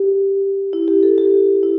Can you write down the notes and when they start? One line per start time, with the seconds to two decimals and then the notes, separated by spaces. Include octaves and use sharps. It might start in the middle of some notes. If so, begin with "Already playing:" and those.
Already playing: G4
0.73 E4
0.88 G4
1.03 A4
1.18 G4
1.63 E4